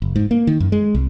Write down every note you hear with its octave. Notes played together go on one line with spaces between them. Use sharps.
F#1
G#2
A#3
D#3
F#2
G#3
C2